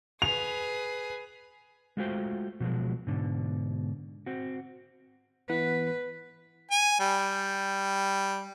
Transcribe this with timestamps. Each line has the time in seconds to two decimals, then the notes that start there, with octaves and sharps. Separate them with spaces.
0.22 G#4 B4 F7
1.97 G#3 A3 F4 F#4 C5 G5
2.60 B2 F3 F#3 G#3
3.07 G#2 B2 D3
4.26 C4 F#4
5.49 E3 B3 B4 F#5
6.71 G#5
7.00 G3